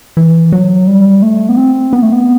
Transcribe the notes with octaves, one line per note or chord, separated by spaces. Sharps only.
E3
F#3
G3
A3
B3
C4
B3
A3
B3